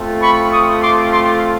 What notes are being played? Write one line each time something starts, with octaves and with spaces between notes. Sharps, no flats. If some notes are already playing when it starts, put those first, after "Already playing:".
Already playing: A3 C4 F4
B5 C#6
C#6 D#6
C6 D6
C6 D6